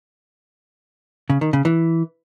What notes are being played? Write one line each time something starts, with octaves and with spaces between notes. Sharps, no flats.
C#3
D#3
C#3
E3